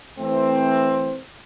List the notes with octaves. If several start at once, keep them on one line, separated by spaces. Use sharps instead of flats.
E3 A3 C4